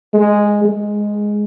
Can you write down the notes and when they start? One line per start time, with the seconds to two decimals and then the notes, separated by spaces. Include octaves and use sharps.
0.14 G#3
0.65 G#3